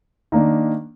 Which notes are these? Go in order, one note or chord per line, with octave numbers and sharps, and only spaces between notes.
D#3 A#3 D4